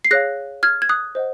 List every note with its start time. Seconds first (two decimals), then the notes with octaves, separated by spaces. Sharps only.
0.05 C7
0.11 G#4 C#5 F5 F#6 A#6
0.63 F6 G#6
0.82 G#6
0.89 D#6 F#6
1.15 C5 D#5 F#5